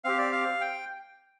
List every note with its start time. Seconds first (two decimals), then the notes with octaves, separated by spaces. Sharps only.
0.04 C4 G4 F5
0.18 D5
0.32 F5
0.61 G5